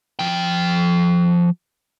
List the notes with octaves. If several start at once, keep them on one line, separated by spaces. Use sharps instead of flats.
F3 G5